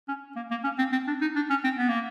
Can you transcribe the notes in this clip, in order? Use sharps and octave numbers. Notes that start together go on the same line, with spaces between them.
C#4
A#3
A#3
C#4
C4
C4
D4
D#4
D4
C#4
C4
B3
A#3